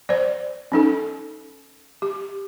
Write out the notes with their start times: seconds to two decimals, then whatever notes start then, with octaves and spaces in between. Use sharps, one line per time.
0.09 C5 D5
0.72 C#4 D#4 A4
2.02 G4